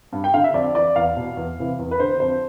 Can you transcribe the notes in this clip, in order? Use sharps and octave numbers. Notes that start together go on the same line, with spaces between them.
G2
G5
D3 F5
E5
F2 D5
E3 D5
E2 F5
B2
E2
C3 E3
E2
B4
D3 C5
F2 C5